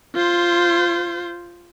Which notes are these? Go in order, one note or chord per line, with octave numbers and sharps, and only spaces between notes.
F4 C5